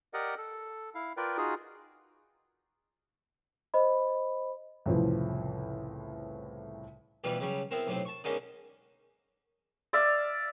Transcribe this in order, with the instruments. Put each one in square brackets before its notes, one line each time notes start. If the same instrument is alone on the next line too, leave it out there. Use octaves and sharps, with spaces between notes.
[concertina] G4 A#4 D5 D#5 F#5
A4
E4 F5
F4 A#4 B4 D5 G5
D#4 F4 F#4 G#4
[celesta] C5 D#5 B5
[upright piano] C2 F2 A2 C#3 E3 F3
[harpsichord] D2 B2 E3 G3 F4 B4
C#3 F#3 G3
B3 C4 E4 A#4
B1 A2 C3 C4
A5 C#6
D3 G#3 A#3 B3 C#4 D#4
[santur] D5 E5 F5